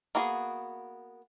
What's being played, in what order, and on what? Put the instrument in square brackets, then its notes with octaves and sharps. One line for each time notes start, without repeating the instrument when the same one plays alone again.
[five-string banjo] A#3 B3 F#4 G#4